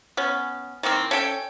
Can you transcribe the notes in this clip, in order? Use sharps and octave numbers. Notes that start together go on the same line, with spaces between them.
B3 C#4
D#3 E3 A#3 C4
C#4 A4 G5